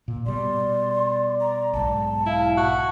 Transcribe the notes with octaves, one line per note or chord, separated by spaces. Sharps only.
A#2
B2 G3 D5 C6
A#5
B1 G#2 A5
E4 F5
F#4